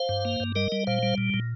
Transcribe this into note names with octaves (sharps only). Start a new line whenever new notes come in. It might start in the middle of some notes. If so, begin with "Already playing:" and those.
Already playing: C5 F5
G2
A#3
G2
G3 A#4 D#5
G3
A#2 C5 F5
G3
A#2
A#2